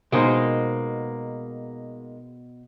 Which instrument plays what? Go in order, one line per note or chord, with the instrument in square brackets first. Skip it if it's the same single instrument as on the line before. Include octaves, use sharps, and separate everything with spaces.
[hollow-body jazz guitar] B2 G#4 C5 [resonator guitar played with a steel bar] G#3 A#3 D#4